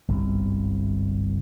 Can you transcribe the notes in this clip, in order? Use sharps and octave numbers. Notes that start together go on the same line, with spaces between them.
G1 C2 G#2 C3